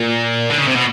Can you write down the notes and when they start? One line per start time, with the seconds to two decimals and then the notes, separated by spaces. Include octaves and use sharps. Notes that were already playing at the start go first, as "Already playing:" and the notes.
Already playing: A#2
0.50 D3
0.58 C#3
0.67 C3
0.75 B2